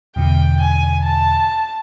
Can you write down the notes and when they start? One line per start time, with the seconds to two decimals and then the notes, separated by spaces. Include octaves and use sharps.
0.16 E2 B2 D3 G5
0.60 G#5
1.04 A5